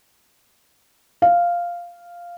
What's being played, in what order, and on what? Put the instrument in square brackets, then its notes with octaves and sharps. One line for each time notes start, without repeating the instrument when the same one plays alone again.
[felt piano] F5